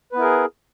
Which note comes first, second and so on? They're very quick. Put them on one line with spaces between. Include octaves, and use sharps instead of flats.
B4 B3 E4 A#4 G#4